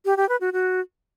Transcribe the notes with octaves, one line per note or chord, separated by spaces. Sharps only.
G4
G4
B4
F#4
F#4